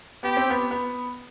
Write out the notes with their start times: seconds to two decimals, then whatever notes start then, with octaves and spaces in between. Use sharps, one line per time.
0.23 B3 G4
0.37 C4
0.50 B3
0.71 B3